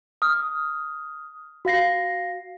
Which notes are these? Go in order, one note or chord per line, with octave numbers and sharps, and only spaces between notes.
D#6 F6
F#4 F5 A#6 C7